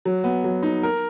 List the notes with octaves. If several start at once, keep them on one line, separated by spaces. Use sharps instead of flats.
F#3
B3
F#3
D#4
A#4